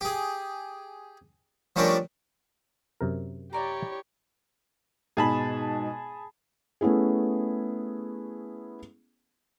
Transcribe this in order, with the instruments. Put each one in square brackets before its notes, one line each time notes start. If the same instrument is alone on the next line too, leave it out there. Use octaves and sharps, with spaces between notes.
[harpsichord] G4 G#4
F3 G3 A3 C#4 D4 A#4
[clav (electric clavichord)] F#2 C3 A#4
[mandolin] E4 D5 A#5 [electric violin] G4 C#5
[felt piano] G#2 B2 [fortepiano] G#4 A5 B5
[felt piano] A3 B3 C#4 E4 G#4